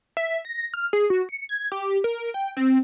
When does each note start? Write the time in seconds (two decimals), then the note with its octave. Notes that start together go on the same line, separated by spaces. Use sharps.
0.17 E5
0.45 A#6
0.74 F6
0.93 G#4
1.10 F#4
1.29 C#7
1.49 G#6
1.72 G4
2.04 A#4
2.34 G5
2.57 C4